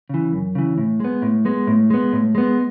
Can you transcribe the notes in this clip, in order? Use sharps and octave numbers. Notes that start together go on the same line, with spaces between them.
C#3 E3
F#2
C#3 E3
A2
G#3 B3
A2
G#3 B3
A2
G#3 B3
A2
G#3 B3